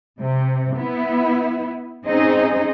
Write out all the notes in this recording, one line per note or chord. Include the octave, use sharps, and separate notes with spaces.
C3
B3 E4
C4 C#4 D#4 G#4 D#5